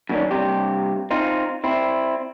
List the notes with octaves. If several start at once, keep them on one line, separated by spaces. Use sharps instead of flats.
F#2 B2 D3 D#3 C#4 D4
G2 C3 G4
C4 D#4 F4
C4 E4